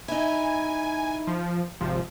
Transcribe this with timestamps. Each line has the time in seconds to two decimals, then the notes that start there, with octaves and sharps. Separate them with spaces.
0.08 D#4 E4 G#5
1.27 F3
1.81 G#1 C3 F3